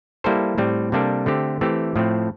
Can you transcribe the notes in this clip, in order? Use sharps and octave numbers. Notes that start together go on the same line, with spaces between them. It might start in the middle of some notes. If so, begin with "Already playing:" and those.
G3 A#3 E4 A4 C5
A2 G3 C4
C3 G3 A#3 D4 A4
D3 A3 C4 G4
E3 A3 C4 G4
A2 F3 A3 C4